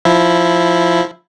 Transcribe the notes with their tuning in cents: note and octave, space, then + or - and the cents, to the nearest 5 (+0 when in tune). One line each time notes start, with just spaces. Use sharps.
F3 +0 E4 +0